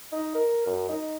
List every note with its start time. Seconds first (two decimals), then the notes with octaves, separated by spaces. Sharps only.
0.12 D#4
0.35 A#4
0.66 F#2
0.89 D#4